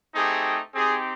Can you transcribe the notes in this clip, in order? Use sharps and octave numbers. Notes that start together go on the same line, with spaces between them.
A3 C4 D#4 G4 G#4
C4 D#4 G4 G#4